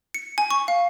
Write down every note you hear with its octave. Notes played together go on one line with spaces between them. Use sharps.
C#7
G#5
C#6
F5